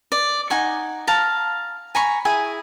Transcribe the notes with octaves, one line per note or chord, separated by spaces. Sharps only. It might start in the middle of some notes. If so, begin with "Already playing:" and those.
D5
D#4 F#5 G#5 C#6
F5 A5 A#5
G#5 A#5 B5 C#6
E4 G#4 G#5